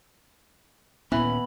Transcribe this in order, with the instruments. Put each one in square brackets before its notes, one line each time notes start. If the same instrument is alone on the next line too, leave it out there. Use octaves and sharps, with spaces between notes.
[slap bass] D#1 A#2 C#4 [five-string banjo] E3 [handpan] B3 [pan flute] B5